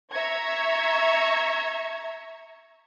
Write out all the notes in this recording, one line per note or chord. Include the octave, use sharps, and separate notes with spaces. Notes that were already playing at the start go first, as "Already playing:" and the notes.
E5 A#5 C#6 G#6